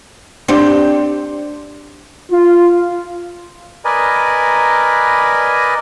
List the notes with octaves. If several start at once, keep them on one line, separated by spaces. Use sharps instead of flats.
C4 D4 G4
F4
A#4 B4 D5 D#5 G#5